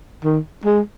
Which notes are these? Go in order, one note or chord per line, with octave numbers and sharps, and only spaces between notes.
D#3
G#3